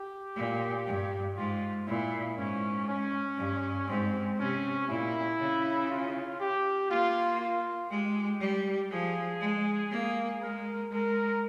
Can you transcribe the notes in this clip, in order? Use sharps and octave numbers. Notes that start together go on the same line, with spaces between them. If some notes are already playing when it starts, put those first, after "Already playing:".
Already playing: G4
A#2
G2
G#2 F4
A#2 E4
G#2 C#4
C#4
G2
G#2 C4
C3 C#4
A#2 E4
C#3
F4
G4
A#3 F4
F4
G#3 G4
G3
F3 G#4
G#3
A#3
G#3 A#4
G#3 A#4